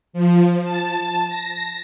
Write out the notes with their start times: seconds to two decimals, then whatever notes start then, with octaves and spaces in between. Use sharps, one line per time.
0.13 F3
0.63 A5
1.28 A#6